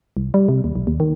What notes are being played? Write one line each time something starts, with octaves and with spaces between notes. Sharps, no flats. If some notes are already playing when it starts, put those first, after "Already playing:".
C2
G3
C3
D#2
B1
D#2
D#3